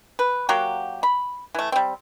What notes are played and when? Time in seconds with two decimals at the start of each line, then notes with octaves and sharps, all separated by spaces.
0.19 B4
0.49 F#3 A#3 F#4 G4
1.03 B5
1.55 E3 A3
1.72 G3 C4